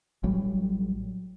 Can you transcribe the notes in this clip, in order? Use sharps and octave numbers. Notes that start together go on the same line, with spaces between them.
A1 F#3 G3